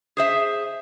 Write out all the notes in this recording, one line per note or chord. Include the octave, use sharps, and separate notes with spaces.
G#4 C5 E5